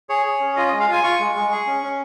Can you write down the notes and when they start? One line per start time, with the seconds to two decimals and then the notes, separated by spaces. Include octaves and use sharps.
0.09 G#4 C#5
0.26 G#4
0.40 C#4
0.56 F4 D#5
0.68 G#3 D#5
0.80 F5
0.88 F4 G#5
1.03 F4 C#6
1.20 G#3
1.35 G#3
1.52 G#4
1.67 C#4
1.83 C#4